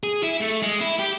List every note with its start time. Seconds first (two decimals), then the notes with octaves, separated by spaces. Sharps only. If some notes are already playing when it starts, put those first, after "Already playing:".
0.03 G#4
0.23 E4
0.41 A3
0.62 G#3
0.81 E4
0.99 G4